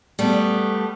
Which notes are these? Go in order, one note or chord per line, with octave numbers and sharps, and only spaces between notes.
G3 A3 B3